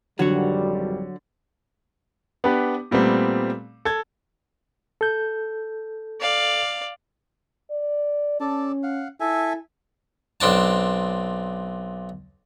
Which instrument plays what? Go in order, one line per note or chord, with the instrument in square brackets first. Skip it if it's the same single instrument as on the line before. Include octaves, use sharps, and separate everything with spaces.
[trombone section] G#1 F2 G3 [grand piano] D3 [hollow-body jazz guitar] F#3 F#4
[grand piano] B3 D4 G4 B4
A#2 G3 A3 B3 C4
A4 G#6
[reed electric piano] A4 G6
[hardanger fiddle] D5 F5
[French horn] D5
[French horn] C#4 [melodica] A4 D5 A5
[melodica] F5 F#5
[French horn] E4 [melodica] A4 E5 G#5
[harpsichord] B1 C4 D4 A5